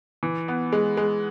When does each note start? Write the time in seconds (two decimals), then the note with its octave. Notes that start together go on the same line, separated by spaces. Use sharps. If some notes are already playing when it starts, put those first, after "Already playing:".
0.23 E3
0.48 B3
0.72 G#3
0.97 G#3